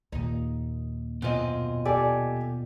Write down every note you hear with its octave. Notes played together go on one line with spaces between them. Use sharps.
D#2 A#2 D#4
F#2 B2 C4 F4 D#5
G4 A4 D5 G#5